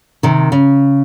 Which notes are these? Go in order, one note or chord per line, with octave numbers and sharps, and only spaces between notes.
C3 D#3
C#3